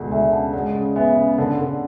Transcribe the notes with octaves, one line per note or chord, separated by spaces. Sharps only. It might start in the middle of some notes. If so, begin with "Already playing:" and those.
Already playing: D2 B2 G#3
D2 E5 G#5
C#3 F#5 A5
G#3 D5 F#5
C#3
B3 E5 G#5
C#3
D3 F#5 A5
D3